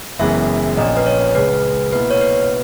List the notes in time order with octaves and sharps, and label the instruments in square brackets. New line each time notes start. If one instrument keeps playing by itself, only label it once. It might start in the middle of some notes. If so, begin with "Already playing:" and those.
[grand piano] F#1 F#2 E3 G#3 B3 [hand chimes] E5
[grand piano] A#1 A#2 A#3 C#4 [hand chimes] D#5
[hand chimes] B4
C#5
[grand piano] C#2 C#3 G#3 [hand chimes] B4
[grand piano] B2 A#3 E4 [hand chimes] B4
[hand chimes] C#5
B4